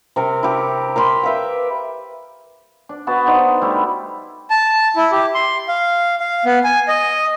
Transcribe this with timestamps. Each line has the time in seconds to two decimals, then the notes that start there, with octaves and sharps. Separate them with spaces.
0.16 C3 C4 A#4
0.43 E4 G4
0.96 A#4 B5 C6 D6
1.23 B4 E5 F5 G5
2.89 D4
3.07 B3 F#4 A5
3.27 D4 D#4 C5
3.62 G3 A3 E4
4.50 A5
4.96 E4
5.11 G4
5.34 C6
5.68 F5
6.20 F5
6.45 B3
6.64 G#5
6.88 D#5